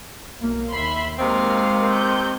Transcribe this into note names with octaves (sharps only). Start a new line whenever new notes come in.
B1 A#3
D#2 E5 B5 C6
C3 D#3 G#3 A#3 C4 A#4 F5
G6